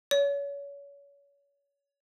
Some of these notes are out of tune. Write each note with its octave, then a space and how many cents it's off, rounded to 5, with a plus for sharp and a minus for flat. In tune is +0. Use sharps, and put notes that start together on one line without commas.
C#5 +30